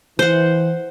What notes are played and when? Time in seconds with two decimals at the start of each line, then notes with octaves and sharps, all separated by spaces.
0.19 E3 C5 F#5